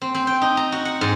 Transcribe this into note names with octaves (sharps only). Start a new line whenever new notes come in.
C4
C4
G5
D#4
A#5
F#4
F#5
G#2